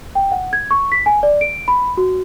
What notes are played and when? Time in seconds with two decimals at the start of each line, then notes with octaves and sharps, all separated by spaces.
0.15 G5
0.32 F#5
0.53 G#6
0.71 C#6
0.92 B6
1.06 G#5
1.23 D5
1.41 D7
1.68 B5
1.97 F#4